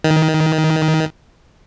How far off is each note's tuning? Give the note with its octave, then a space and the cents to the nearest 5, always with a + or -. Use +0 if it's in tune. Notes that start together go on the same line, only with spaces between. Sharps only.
D#3 +20